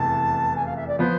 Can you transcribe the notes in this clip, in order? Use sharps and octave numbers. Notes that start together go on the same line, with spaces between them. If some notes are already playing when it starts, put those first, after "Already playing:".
Already playing: F1 E2 A5
G#5
F5
E5
D5
F3 B3 C5